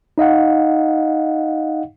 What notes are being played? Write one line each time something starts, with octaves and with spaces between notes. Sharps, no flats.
D#4 D#5 F5 F#5